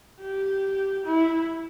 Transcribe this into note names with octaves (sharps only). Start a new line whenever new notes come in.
G4
E4